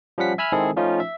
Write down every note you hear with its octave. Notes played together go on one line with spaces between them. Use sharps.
F3 G3 C#4 F#5 B6
E5 G#5 B5 E6 F6
D#3 G#3 C4 E4 G#4 A4
F3 A3 C#4 D#4 F4
E5